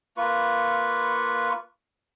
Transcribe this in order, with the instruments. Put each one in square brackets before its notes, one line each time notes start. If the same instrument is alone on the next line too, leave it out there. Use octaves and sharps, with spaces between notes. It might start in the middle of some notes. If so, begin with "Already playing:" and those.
[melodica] A#3 F4 B4 C#6